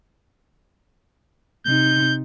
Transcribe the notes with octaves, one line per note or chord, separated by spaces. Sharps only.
C3 D#4 G6